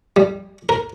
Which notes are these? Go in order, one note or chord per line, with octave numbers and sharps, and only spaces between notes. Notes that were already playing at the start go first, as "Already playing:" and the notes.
G3
A#4